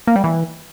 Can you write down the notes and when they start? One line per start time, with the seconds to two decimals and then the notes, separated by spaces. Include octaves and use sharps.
0.07 A#3
0.16 G3
0.24 E3